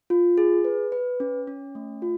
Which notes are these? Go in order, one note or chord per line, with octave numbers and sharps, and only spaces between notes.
F4
G#4
B4
B4
C#4
C#4
A3
F4